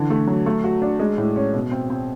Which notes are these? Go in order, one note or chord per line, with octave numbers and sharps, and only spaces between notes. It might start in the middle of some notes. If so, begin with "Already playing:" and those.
Already playing: D3 E3
A3
F#3
A3
F#4
D4
G#3
A2
C#4
B2
C4
C4